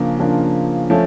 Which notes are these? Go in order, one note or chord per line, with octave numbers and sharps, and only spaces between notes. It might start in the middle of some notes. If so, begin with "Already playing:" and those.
Already playing: C#3 F3 A#3 D4 F4
C#3 F3 A#3 D4 F4
F3 A3 C#4